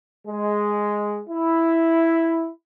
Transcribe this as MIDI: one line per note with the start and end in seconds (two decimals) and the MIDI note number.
0.26 1.20 56
1.29 2.48 64